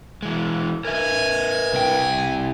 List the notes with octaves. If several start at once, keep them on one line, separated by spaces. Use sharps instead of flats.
E3 G#3
A#4 B4 E5 G#5
C2 G5